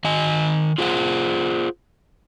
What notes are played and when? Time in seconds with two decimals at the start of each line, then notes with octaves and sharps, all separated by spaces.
0.05 D#3 D#5 G#5
0.78 F4 G#4 C5 F#5